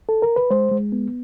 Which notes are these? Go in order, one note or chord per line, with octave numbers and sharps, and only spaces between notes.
A4
A#4
B4
G#3 C5
G#3
B3